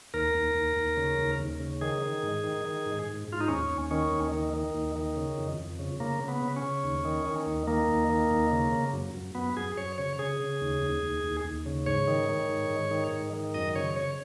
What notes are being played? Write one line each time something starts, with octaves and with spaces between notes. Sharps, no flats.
D#2 A#4
D#2
D#2
D#2
C#3
D#2
D#2
C#3
D#3 G#4
D#3
G#2
D#3
D#3
G#2
G#2
G#2 F4
D#4
D#2 C#4
D#2
D#3 C#4
D#2
D#3
D#3
D#2
D#3
C#3
F2
F2
C#3
C#3 A#3
C#3
B3
C#3
C#4
C#3
D#2
D#3
D#3
D#2
D#3 A#3
D#2
D#3
D#2
C#3
C#3
F#2
F#2
F#2 B3
F#2 G#4
F#2 C#5
C#3 C#5
C#3 G#4
C#3
D#2
D#2
D#2
D#2
D#2
C#3
G#2 C#5
D#3
D#3
G#2
G#2
D#3
G#2
D#3
F#2 D#5
C#3 C#5
C#3 C#5